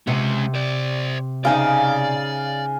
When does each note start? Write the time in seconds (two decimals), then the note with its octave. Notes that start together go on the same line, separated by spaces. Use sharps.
0.07 C3 G#3 C#4 F#5
0.55 C5 D5
1.45 C#3 D#4 D5 F5 G#5